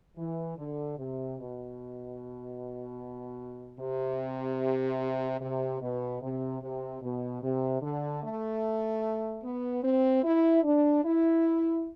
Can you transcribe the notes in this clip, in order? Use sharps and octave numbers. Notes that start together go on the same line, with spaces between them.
E3
D3
C3
B2
C3
C3
B2
C3
C3
B2
C3
D3
A3
B3
C4
E4
D4
E4